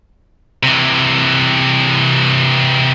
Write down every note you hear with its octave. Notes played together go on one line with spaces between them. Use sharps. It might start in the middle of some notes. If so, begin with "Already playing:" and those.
C3 E3